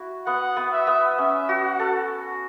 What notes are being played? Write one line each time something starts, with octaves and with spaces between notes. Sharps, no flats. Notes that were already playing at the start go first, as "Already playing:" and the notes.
Already playing: E4 F#4
B3 F#5
B3
E5
B3
C#4 E5
F#4
F#5
A4